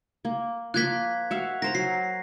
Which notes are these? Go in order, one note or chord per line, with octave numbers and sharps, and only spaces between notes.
A#3
F3 A#3 F4 F#6 G#6 B6
F#4 E5 F5
A#4 C5 A#5 A#6
F#3 C7